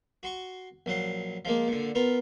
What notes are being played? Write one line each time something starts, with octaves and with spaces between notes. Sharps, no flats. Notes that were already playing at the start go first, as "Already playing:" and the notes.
F#4 C6 C#6
A#1 F#3 F#5 C6
F3 G#3 A#3
A#2 D3
B3 F4 A#4